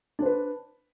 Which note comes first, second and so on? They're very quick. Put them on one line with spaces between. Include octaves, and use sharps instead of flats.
D4 C5 B4